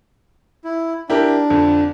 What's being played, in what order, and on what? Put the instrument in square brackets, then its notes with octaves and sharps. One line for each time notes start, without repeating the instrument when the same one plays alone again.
[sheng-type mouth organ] E4
[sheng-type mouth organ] D4 [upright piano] E4 G4 A#4
[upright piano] F2 D3